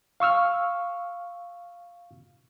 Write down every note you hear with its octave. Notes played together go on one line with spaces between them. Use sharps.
F5 C#6 E6 F6